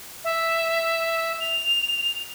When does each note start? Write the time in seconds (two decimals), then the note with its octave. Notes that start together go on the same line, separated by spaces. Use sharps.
0.24 E5
1.40 F7